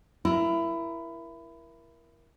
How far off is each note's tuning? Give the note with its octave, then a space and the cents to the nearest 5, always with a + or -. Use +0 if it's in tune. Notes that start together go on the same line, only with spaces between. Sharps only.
E4 +20 A#4 +25